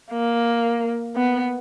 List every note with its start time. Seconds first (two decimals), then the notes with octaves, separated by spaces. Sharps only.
0.12 A#3
1.16 B3